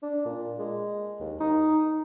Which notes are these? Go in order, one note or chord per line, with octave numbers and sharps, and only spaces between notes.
D4
A#2
G#3
D#2
D#4